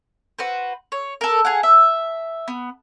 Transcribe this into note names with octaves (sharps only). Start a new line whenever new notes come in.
F#4 B4 C5
C#5
A4 A#4
G#4 F5 F#5
E5
B3